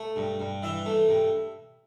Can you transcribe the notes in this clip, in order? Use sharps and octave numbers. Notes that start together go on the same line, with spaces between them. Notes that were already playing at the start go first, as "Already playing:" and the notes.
Already playing: A3
G2
G2
E3 E5
A3
G2